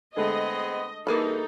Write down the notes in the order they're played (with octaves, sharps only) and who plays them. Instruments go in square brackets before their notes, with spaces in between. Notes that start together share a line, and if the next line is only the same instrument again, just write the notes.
[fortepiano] D3 G#3 A3 [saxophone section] B3 C4 G#4 [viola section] D#5
[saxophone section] G2 E3 F#4 [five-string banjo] A#3 G#4 B5 [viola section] D#4 A4